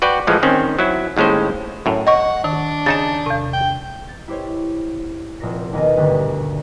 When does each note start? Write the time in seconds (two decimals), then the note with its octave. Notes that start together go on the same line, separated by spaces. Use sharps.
0.02 F#4 B4 D5 G5
0.27 A2 E3 F3 G#3
0.43 D#3 C4 C#4
0.79 F#3 E4
1.16 D#2 A2 G#3 C#4 C5
1.86 F#2 A2
2.07 D#5 F#5 C#6
2.44 D#3 D4
2.86 C#3 D#4 A5 A6
3.26 E2 C3
3.53 G5
4.07 G6 A6
4.28 E4 G4 C5 C#5
5.40 F1 A#2 A#6
5.73 D#2 B2 A#3 B3 G#5 A#6
5.97 D#1 D2 G2 D3 G4